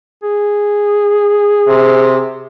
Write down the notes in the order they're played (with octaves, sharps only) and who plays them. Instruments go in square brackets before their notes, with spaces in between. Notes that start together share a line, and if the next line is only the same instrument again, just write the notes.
[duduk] G#4
[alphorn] C3